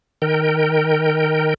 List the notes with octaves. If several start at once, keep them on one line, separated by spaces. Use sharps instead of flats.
D#3 A#4 G5